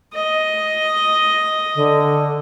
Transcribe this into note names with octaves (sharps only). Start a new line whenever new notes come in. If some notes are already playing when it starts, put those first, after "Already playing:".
D#5
D3